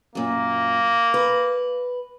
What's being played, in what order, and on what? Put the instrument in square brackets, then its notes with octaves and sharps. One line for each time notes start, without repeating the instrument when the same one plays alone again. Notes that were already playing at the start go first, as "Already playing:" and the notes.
[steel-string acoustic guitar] F#2 A#2 [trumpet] A#3
[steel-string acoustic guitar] B4